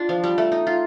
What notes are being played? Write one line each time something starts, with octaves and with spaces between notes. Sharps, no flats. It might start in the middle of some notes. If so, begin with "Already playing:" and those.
Already playing: D4 F4
F3
G3
A3
D#4
F4